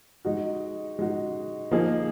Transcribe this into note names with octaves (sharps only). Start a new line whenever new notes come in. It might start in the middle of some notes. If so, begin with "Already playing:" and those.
G#3 D#4 F#4
G#3 D#4 F#4
F3 A#3 D#4 G#4